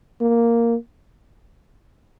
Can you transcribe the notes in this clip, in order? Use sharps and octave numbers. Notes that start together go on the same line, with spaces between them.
A#3